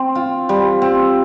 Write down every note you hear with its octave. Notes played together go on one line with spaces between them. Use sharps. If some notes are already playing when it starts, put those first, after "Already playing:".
Already playing: C4
F4
G3
C4